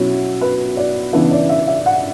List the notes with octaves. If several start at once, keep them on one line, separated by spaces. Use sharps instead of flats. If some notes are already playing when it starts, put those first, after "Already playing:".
Already playing: B2 F#3 C#4 E4
B4
D5
C#3 E3 B3 D4 E5
D5
E5
E5
F#5